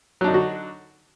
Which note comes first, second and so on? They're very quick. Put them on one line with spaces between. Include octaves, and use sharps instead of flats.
F#3 D4 D#4 D3 F#4